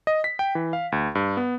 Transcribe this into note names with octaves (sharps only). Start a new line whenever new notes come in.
D#5
B6
G5
E3
F5
D2
G2
B3